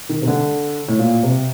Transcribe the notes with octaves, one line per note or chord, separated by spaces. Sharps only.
D#3
C3
D3
A2
A#2
C3